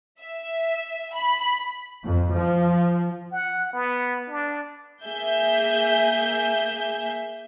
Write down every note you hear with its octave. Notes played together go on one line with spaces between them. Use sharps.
E5
B5
F2
F3
F#5
B3
D4
A#3 G#4 E5 G6